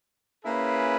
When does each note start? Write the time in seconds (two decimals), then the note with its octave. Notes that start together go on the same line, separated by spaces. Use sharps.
0.44 A#3 C#4 E4 G#4 B4